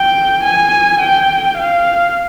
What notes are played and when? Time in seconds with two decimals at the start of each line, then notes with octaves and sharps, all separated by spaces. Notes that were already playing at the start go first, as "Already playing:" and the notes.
Already playing: G5
0.44 G#5
1.00 G5
1.57 F5